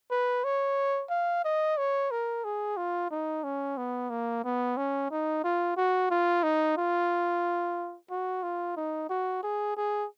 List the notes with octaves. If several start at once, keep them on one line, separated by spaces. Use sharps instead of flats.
B4
C#5
F5
D#5
C#5
A#4
G#4
F4
D#4
C#4
B3
A#3
B3
C#4
D#4
F4
F#4
F4
D#4
F4
F#4
F4
D#4
F#4
G#4
G#4